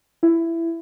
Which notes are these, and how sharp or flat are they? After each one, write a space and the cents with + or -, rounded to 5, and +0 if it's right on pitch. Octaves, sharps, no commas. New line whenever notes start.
E4 +15